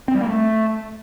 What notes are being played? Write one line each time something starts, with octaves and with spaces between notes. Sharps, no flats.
C4
G3
A#3
A3